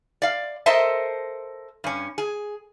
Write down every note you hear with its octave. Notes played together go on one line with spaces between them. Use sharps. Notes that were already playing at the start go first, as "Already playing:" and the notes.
D5 F5
A4 A#4 C5 D#5 E5 A5
G2 C#4
G#4